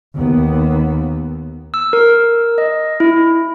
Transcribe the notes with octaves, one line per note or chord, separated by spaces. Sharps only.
D#2 B3
E6
A#4
D#5
E4